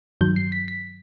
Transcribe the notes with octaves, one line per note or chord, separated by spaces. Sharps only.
G2 D#3 F#3 G6
C7
B6
B6